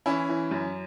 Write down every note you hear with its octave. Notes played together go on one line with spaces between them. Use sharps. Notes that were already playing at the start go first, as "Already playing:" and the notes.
E3 C#4 E4
E3
F#2